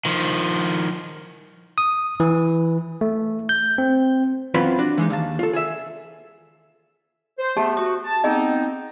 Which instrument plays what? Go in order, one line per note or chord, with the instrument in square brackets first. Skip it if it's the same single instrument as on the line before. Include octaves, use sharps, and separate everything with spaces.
[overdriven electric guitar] D#3 F3
[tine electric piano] D#6
E3
A3
G6
C4
[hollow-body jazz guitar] F#2 E3 B3 C4 F4 B5
D4 F#4
E3 G#3 D#4
D#2 F5 A5
F4 A4
G#4 E5
[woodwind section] C5
[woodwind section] A3 B3 [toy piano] G4 G#4 A5
[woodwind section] F#4 [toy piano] D#6
[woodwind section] A5
[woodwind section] B3 C4 D#4 [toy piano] G#4 D#5